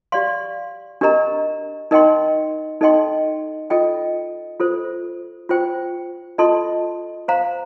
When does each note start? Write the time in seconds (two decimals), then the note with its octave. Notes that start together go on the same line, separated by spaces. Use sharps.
0.12 G4 D5 F5 C6
1.01 D4 G4 A#4 D#5 A#5
1.91 D#4 A#4 D#5 G5 C6
2.81 D#4 A4 D#5 G5 C6
3.70 F4 A4 D#5 G5
4.60 F4 A4 C5
5.49 F4 C5 G5
6.38 F4 A4 D#5 A5 C6
7.28 C5 F5 A#5